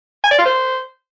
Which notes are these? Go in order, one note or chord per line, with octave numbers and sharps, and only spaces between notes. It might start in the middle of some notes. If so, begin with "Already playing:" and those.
G#5
D5
F4
C5